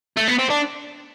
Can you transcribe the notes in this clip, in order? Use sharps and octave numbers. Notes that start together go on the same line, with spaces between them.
A3
B3
C4
D4